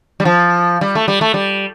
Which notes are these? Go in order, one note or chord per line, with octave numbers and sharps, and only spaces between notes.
G3
F3
G3
A3
G3
A3
G3